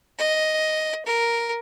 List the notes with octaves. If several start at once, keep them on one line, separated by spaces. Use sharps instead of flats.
D#5
A#4